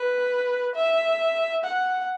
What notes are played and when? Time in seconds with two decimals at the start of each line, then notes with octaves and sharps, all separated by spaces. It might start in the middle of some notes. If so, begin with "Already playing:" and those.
Already playing: B4
0.75 E5
1.64 F#5